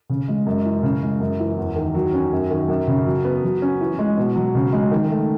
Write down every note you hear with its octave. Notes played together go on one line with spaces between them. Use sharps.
C#3
G#3
F#2
E3
C#3
G#3
F#2
E3
E2
D#3
F#3
C#4
F#2
D#3
F#2
C#3
F#3
B3
F#3
C#4
E3
G#3
B2
F#3
C#3
G#3
D#3
A3